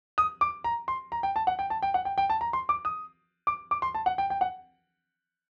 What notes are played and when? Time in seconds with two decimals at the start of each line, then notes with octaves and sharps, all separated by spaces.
0.18 D#6
0.41 D6
0.64 A#5
0.88 C6
1.12 A#5
1.23 G5
1.36 A5
1.47 F#5
1.59 G5
1.70 A5
1.83 G5
1.94 F#5
2.05 G5
2.18 G5
2.30 A5
2.41 A#5
2.53 C6
2.69 D6
2.85 D#6
3.47 D6
3.71 D6
3.82 C6
3.95 A5
4.06 F#5
4.18 G5
4.30 G5
4.41 F#5